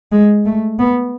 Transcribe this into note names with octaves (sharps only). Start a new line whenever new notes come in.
G#3
A3
B3